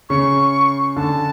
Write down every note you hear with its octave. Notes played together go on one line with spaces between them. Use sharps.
C#3 C#6
D3 A5